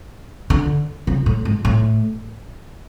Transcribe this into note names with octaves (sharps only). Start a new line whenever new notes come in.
D3
C#3
A2
G#2
A2